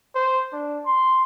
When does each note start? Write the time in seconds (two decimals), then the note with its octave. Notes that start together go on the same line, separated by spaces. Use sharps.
0.15 C5
0.52 D4
0.85 C6